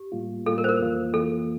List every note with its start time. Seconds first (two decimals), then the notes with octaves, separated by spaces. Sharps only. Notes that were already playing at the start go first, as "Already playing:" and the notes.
Already playing: G4
0.12 A2 G3 A#3 F4
0.46 A2 G3 A#3 F4 A4
0.58 A#4
0.64 C5
0.69 A#4
0.80 F2 E3 A#3 F4
1.14 F2 E3 A#3 F4 A4